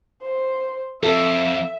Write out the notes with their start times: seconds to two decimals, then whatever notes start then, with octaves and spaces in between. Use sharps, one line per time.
0.22 C5
1.03 F2 A4 E5